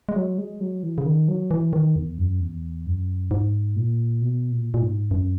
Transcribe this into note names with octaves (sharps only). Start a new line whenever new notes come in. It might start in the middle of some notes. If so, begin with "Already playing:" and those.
G#3
F#3
G#3
F#3
E3
C#3
D#3
F#3
E3
D#3
E2
F#2
E2
F#2
G#2
A#2
B2
A#2
A#2
G#2
F#2